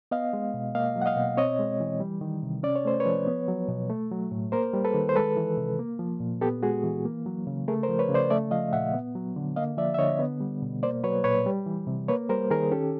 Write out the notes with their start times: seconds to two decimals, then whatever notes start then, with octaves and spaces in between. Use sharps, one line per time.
0.11 B3 D#5 F5
0.33 G#3
0.54 B2
0.75 A#3 D#5 F5
0.96 F#3
1.02 F#5
1.06 D#5 F5
1.17 B2
1.37 C4 C#5 D#5
1.59 G#3
1.80 E3
2.00 G3
2.21 D#3
2.43 C3
2.63 C#4 D5
2.76 C#5
2.85 A3 C5
3.00 B4 C#5
3.06 F3
3.27 B3
3.48 F#3
3.69 B2
3.89 A3
4.11 F#3
4.32 A2
4.52 A#3 A#4 C5
4.73 G3
4.85 A4 B4
4.94 D#3
5.09 C5
5.16 G#3 A4 B4
5.37 E3
5.57 C3
5.79 A#3
5.99 F3
6.20 A#2
6.41 B3 G4 A4
6.63 G#3 F#4 G#4
6.84 E3
7.05 A#3
7.26 F#3
7.47 C#3
7.68 A3 G#4 A#4
7.83 A#4 C5
7.89 F3
7.99 B4 C#5
8.09 C#3
8.14 C5 D5
8.30 A3 D5 E5
8.51 F3 D#5 F5
8.73 A#2 E5 F#5
8.94 B3
9.15 F#3
9.36 D3
9.56 A#3 D#5 F5
9.78 F3 D5 E5
9.94 E5
9.99 D3 C#5 D#5
10.19 B3
10.41 G3
10.62 B2
10.83 A#3 C5 D5
11.04 F#3 B4 C#5
11.24 A#2 B4 C#5
11.46 G3
11.66 E3
11.87 C3
12.08 A#3 B4 C#5
12.29 G3 A#4 C5
12.50 D#3 G#4 A#4
12.72 C#4 G4 A4